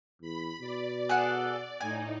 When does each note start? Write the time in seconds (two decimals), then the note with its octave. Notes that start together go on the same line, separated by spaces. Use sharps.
0.22 E2 B5
0.61 B2 D5
1.09 G#4 A4 D5 F#5
1.81 A2 D#4 G#5